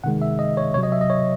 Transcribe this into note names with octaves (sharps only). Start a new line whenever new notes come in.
C3 D#3 G#3 F#5
E5
D#5
C#5
C3 F#3 C#5
D#5
E5
D#5
C#5